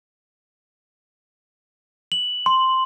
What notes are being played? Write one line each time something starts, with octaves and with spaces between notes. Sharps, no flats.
F#7
C6